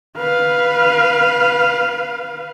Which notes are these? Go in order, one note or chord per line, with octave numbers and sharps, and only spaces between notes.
B4 F5